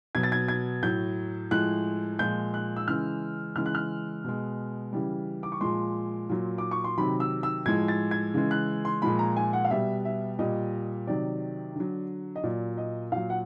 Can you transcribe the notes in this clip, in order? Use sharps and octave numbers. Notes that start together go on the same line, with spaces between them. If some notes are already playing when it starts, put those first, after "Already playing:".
B2 F#3 G#6
A6
G#6
G#6
A2 F#3 G6
A2 F3 G#3 F#6
A#2 F3 G#3 G6
F#6
E6
C#3 E3 G#3 F6
C#3 E3 G#3 F6
F#6
F6
B2 G#3
C#3 E3 G3
D6
C#6
A#2 F3 G#3 C6
A#2 F#3
D6
C#6
C6
C3 D#3 F#3 B5
E6
E6
A2 F3 G#3 G#6
A6
G#6
C#3 E3 G#3
F#6
C6
A#2 F3 G#3 B5
A#5
G#5
F#5
F5
B2 G3 E5
E5
A#2 G3 D#5
C3 D#3 F#3 D5
D3 F#3
D#5
A#2 F#3 D5
D#5
A#2 F#3 F5
F#5